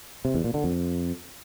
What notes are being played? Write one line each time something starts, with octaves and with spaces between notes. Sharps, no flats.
C3
E2
A#2
D3
F2